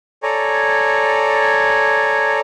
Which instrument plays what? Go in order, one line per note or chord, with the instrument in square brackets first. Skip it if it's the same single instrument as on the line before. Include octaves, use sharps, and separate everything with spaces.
[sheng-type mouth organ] A4 C#5 D5 G#5 A#5